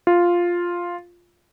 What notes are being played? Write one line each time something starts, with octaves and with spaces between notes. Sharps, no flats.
F4